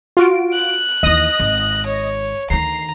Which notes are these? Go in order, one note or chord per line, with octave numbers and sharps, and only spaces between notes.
F4 F#4 D7
F#6
D#2 E3 D#5 D#6 A#6
G#1
C#5
D2 D#3 A#5 C7